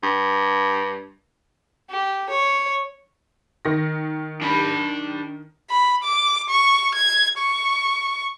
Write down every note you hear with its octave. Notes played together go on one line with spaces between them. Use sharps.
G2
G4
C#5
D#3 A#6
D4 B5
B5
D6
C#6
G#6
C#6